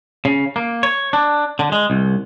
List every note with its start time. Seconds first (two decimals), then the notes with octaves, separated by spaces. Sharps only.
0.25 C#3
0.56 A#3
0.83 C#5
1.13 D4
1.59 D3
1.72 G#3
1.90 C2